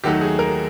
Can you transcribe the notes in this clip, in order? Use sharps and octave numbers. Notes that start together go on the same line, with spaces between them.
D#2 D#3 F#3 A3 G4
G#4
A#4